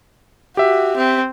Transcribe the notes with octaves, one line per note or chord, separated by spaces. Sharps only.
F#4 G4 E5
C4